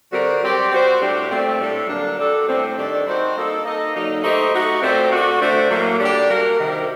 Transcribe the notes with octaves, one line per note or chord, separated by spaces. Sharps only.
D3 G3 C4 F#4 A#4
F#3 C4 G4 D5
G3 C4 F#4 C5
A2 G3 D4 G4
A#2 A3 C4
A2 G3 D4 A4
D3 F#3 A#3 D4
G3 D4 F#4 A4
A2 A3 C4
D#3 G3 D4 A4 D5
G3 C4 D#4 F#4 C5
A#3 D#4 A4
A#3 D#4 A4 D#5
D3 F#3 A#3 D#4
A3 D#4 G4 C5 D#5
A3 D#4 F#4
A#2 A3 C4 G4 C5
A3 D4 F#4
D3 A3 D4 F#4 C5
A2 F#3 A#3
D3 G3 D4 G4
A#3 F#4 A#4
C3 D#3 G3